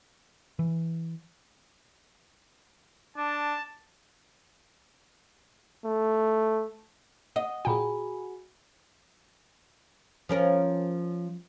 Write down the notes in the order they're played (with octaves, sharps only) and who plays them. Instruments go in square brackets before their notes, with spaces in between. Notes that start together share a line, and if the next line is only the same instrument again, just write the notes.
[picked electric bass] E3
[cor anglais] D4 [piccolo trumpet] A5
[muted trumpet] A3
[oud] D#5 [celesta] F#5
[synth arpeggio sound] A#2 G5 [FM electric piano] F#4 G#4 [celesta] G#5 A#5 B5
[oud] F3 C#4 A#4